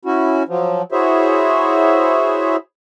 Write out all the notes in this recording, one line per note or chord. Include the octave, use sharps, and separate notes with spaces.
C#4 E4 F#4
F3 F#3
E4 F#4 G#4 C5 C#5 E5